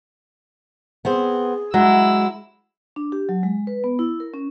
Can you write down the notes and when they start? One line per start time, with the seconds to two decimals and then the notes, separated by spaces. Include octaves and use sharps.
1.05 B3 C4 G#4 C5
1.74 F#3 G#3 E4 E6
2.96 D4
3.12 G4
3.29 F#3
3.43 G#3
3.67 B4
3.84 B3
3.99 E4
4.20 A#4
4.34 C#4